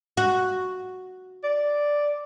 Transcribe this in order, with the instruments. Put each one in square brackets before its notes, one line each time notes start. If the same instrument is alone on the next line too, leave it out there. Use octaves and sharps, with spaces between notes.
[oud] F#4
[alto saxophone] D5